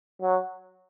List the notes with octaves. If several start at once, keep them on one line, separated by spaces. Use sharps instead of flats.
F#3